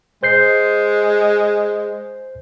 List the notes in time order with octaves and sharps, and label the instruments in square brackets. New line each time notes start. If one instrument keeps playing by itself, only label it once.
[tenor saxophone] G#3 [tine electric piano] C5 G6 C7